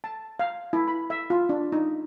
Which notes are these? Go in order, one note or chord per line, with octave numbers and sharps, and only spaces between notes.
A5
F5
E4
B5
E5
F4
D4
D#4